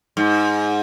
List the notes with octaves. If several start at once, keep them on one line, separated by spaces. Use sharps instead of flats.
G#2